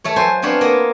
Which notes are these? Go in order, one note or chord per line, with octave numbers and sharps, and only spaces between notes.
A3 A4 C#5
F#3 C5 G#5
B3 C4 D4 C#5 F5 B5
A#3 B3 F4 C#5